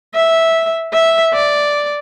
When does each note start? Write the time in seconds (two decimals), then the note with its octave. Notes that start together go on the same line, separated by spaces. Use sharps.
0.15 E5
0.93 E5
1.34 D5